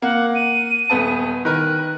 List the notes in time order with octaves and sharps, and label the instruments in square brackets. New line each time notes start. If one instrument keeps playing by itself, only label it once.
[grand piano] A#3 [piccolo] F#5
[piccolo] D#7
[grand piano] D#1 B3 A5
[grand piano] D#3 A#4 B4 [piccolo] F#6